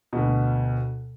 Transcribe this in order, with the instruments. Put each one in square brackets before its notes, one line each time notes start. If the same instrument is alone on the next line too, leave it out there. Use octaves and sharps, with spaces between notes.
[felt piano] D2 B2